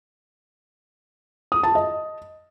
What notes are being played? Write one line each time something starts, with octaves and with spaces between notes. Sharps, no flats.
D#6
A5
D#5